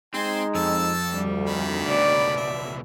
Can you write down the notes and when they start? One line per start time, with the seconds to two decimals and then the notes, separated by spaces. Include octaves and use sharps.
0.14 G#3 C4 D#4 C5 G#5
0.55 F2 A4 A5 E6
1.12 D2 G3
1.47 D#3 B5
1.87 C#2 B2 D5
2.37 E5